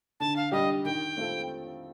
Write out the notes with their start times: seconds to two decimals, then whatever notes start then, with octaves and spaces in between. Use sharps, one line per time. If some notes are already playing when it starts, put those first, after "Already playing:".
0.20 D3 A5
0.36 F5
0.52 G3 D4 G4 D#5
0.85 D#3 G5
1.17 A3 C4 F4 A4